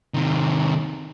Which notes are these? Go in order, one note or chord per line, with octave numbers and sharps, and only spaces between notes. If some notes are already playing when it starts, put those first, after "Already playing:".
C3 D#3